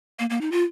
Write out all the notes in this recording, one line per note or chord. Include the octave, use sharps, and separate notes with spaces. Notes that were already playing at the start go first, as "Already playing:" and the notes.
A#3
A#3
D#4
F4